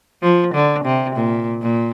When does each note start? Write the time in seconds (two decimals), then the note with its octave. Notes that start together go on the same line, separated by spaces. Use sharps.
0.22 F3
0.54 D3
0.85 C3
1.15 A#2
1.62 A#2